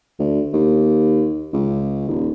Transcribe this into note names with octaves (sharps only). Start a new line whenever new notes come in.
D2
D#2
C#2
D#1